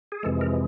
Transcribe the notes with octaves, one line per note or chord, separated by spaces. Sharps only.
G#4
F2 C3 E3 G#3 A4
A#4